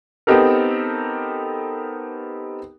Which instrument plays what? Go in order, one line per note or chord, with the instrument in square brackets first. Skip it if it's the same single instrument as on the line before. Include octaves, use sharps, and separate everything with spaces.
[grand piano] B3 C4 D#4 G4 A4 A#4